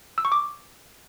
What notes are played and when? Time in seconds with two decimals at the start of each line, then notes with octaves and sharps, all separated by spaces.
0.18 E6
0.25 C#6
0.32 D6